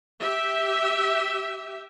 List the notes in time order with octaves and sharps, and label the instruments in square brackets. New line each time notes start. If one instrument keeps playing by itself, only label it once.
[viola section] G4 E5